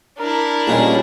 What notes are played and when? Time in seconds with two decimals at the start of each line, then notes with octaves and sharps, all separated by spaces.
0.18 D4 E4 A#4
0.67 A1 A#2 G3 C#4 D#4 G#4